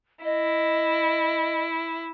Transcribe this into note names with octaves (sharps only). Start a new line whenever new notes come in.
E4 D#5